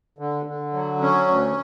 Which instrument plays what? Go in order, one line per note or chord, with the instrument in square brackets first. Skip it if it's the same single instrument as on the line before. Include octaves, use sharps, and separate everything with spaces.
[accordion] D3
D3
F#3
C#4
D2